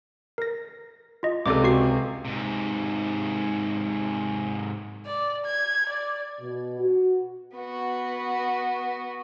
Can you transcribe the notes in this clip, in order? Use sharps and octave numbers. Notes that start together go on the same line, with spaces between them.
A#4 A#6
F4 D#5
C#2 C3 A4 D5 D6
F#4 C#6 C7
G#2 C3
D5
G#6
D5
B2
F#4
B3 F#4